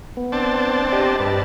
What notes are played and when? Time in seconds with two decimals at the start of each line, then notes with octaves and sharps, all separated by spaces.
0.17 B3
0.32 C4 D4 A5
0.92 G4 D5 D#5
1.20 G2 B4 D5 A5